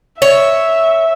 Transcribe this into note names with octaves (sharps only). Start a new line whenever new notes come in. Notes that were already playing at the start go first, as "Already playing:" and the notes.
C#5 E5